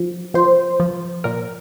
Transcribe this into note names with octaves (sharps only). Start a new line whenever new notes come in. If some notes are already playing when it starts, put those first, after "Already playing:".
Already playing: F3
F3 C5
F3
A#2 A#4